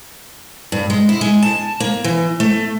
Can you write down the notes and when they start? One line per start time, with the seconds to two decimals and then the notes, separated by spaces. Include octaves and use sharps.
0.72 G2
0.90 G#3
1.09 E4
1.21 G#3
1.42 A5
1.80 A#3
2.04 E3
2.40 A3